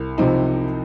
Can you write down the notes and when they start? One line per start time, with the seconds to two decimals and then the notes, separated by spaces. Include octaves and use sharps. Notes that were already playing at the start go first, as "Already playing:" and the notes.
Already playing: C2
0.18 C3 F3 C4 D#4